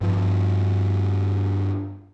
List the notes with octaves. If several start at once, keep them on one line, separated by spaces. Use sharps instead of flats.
G2 F3